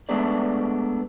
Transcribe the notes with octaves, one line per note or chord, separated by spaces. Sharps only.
G#3 A3 B3 D4 G#4 D5